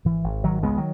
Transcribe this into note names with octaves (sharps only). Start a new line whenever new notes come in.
G#1 E3
G#1
G#1 D#3 F#3
C#2 G#3 B3
D#3 F#3